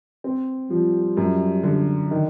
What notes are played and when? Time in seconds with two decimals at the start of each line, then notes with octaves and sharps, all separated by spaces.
0.24 C4
0.70 F3 G3
1.17 F#2
1.63 D3
2.11 D#3